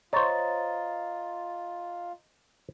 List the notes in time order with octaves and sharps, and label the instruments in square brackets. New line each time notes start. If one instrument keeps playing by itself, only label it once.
[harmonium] F4 [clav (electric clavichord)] C5 C#5 [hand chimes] D#5 A#5 A6